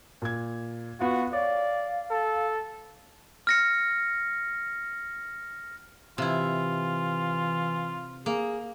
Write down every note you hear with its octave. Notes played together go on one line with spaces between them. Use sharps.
A#2 G#6
B3 F4 F#4
C#5 D5 F5
A4
F6 A#6 C#7
C3 E3 E4 F4
A#3 G#4